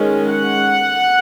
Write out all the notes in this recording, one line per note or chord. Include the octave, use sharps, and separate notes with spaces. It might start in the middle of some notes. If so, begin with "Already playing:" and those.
Already playing: D#3 G#3 C#4
F#5